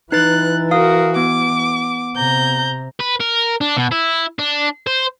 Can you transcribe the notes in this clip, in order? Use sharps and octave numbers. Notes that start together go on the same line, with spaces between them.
E3 D#4 B4 F#6 A6
F#4 A#4 F5 D#6
B3 D6
C3 A#5 G6
B4
A#4
D4
B2
E4
D4
C5